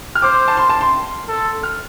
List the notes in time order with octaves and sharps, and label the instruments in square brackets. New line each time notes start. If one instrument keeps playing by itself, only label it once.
[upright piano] F6
[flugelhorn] C5 [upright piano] D6
[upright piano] A5
C6
A5
C6
[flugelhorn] A4
[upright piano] F6